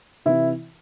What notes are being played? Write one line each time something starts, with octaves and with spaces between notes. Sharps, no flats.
C3 E3 E4